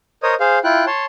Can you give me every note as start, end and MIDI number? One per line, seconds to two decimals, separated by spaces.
0.23 0.35 70
0.23 0.35 72
0.23 0.35 73
0.23 0.35 75
0.23 0.35 87
0.40 0.59 68
0.40 0.59 72
0.40 0.59 77
0.64 0.85 64
0.64 0.85 65
0.64 0.85 79
0.64 0.85 90
0.87 1.05 73
0.87 1.05 81
0.87 1.05 84